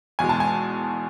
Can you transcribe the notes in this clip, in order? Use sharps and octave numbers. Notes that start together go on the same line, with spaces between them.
E2 B2 G#3 G#5
A5
G#5